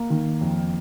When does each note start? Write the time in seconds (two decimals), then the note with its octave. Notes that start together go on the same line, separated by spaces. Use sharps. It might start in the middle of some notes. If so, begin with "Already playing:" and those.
Already playing: A#3
0.10 D#3
0.41 F2